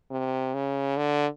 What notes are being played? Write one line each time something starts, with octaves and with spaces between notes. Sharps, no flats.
C3
C#3
D3